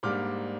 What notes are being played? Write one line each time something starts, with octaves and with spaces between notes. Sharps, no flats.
G#2 G3 A#3 D4 D6 F6